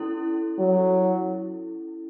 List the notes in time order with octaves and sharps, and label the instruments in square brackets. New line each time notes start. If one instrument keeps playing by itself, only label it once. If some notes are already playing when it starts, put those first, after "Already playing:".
Already playing: [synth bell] C#4 E4 A4
[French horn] F#3